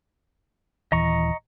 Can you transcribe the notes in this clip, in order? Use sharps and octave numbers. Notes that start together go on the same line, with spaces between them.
D#1 E3 D#5 A#5 C#6